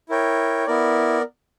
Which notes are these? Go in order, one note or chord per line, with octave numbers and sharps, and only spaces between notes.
E4 A#4 C#5 G5
B3 E4 A#4 D5